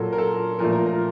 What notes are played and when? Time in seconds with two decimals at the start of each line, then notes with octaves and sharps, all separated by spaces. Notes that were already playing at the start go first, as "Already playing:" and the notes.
Already playing: A#2 F#3 A#3 A4
0.13 A#4
0.18 A4
0.59 A#2 F3 A3 A#4
0.72 A#4
0.86 A#4